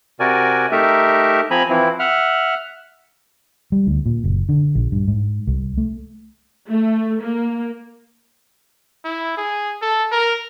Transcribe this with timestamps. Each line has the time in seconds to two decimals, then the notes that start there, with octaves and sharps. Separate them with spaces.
0.20 C3 F#4 A#4 D5 G#5
0.72 A3 D#4 G4 A#4 E5
1.51 F3 C4 G#5 A#5 B5
1.69 E3 F3 C4 E4
1.99 E5 F#5 F6
3.72 G3
3.87 D2
4.06 A#2
4.24 F#1
4.49 D3
4.75 A#1
4.92 G2
5.08 G#2
5.47 C2
5.77 A3
6.71 A3
7.22 A#3
9.04 E4
9.37 G#4
9.82 A4
10.12 A#4